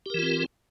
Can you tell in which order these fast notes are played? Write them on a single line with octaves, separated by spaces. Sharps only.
G4 A#4 E3 F4 C4